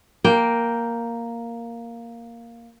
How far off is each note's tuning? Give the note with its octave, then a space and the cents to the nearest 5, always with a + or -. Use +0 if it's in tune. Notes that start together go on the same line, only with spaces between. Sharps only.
A#3 +0 G5 +0